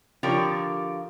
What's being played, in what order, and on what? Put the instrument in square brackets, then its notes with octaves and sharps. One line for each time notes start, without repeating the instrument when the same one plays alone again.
[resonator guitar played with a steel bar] D3 F3 F4 G4 A#4 C#5